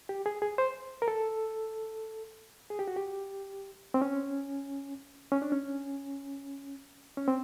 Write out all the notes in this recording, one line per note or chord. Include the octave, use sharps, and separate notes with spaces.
G4
G#4
G#4
C5
A#4
A4
G#4
G4
F#4
G4
C4
C#4
C#4
D4
C#4
C#4
C4